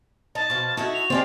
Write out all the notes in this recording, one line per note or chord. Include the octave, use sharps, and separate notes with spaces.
D#4 A5
B2 F3
A3 D#4 E4 F#4
F7
F3 G#3 C4 G4 D5